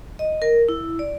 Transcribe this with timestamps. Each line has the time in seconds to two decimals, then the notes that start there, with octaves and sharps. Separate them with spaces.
0.19 D#5
0.42 A#4
0.69 E4
0.99 D5